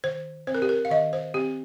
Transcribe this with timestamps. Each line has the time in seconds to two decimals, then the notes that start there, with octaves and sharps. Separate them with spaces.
0.04 D#3 C5
0.47 C4 C5
0.54 A#4
0.62 G4
0.69 A#4
0.85 F5
0.90 D#3 D#5
1.13 C5
1.34 C4 G4